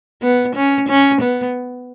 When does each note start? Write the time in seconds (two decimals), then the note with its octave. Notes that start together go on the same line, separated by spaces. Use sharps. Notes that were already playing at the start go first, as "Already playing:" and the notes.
0.22 B3
0.55 C#4
0.88 C#4
1.21 B3